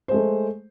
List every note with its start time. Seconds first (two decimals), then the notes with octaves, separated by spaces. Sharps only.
0.08 C5
0.11 G#3
0.14 A3